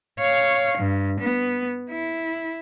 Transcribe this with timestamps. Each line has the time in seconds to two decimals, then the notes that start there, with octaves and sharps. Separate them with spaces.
0.20 C#5 F5
0.78 G2
1.20 B3
1.91 E4